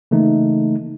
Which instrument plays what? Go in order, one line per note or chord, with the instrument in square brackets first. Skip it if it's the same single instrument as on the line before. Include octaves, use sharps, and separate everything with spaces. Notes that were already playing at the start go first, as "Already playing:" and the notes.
[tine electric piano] C#3 E3 A3 A#3 D#4